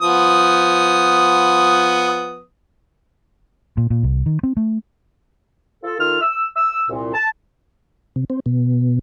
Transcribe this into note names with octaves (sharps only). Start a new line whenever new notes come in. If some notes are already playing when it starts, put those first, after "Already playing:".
F3 B3 D#6
A#2
A#2
C2
D#3
C4
A3
F4 A4
D#3 F4 A4 F6
E6
E6
C2 A#2
A5
C3
C4
B2